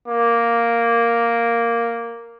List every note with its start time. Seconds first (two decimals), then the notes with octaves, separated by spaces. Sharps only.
0.08 A#3